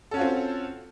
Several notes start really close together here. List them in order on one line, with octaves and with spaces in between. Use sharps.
A4 C#4 F#4 F4 C4